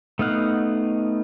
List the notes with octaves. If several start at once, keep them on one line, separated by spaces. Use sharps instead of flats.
A3 B3 D#4 F5 F#5